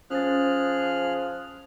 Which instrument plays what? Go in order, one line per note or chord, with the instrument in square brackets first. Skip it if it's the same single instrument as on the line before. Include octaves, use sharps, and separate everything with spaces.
[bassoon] F3 [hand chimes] C#4 C5 A6 [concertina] G#4 F6 F#6